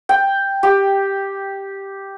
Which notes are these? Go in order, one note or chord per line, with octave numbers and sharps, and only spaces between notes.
G5
G4